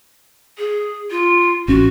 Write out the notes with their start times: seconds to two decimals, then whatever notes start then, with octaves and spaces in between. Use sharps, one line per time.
0.58 G#4
1.10 F4
1.68 A1 C#4 F#4